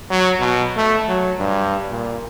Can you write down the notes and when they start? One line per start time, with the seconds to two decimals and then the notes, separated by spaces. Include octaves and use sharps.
0.11 F#3
0.40 B2
0.77 A3
1.08 F#3
1.39 G2
1.91 A#2